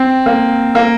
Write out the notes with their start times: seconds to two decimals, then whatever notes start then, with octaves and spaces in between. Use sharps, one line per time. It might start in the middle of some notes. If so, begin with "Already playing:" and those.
Already playing: C4
0.26 A#3
0.75 A#3